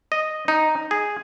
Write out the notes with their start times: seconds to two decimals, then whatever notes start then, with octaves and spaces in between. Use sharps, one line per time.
0.12 D#5
0.48 D#4
0.91 G#4